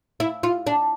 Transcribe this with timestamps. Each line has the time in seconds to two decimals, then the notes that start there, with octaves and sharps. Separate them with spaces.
0.20 E4
0.43 F4
0.67 D4